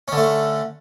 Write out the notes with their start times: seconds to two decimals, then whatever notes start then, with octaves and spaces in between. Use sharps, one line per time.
0.08 C#4
0.12 D3
0.17 A3